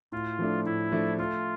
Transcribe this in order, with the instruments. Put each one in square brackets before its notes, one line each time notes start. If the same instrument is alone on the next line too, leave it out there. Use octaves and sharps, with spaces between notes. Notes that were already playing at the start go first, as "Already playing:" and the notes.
[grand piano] A2 [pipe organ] F4
[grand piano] F3 A3 D4
[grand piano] A2 [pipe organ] E4
[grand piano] F3 A3 D4
[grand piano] A3 [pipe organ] F4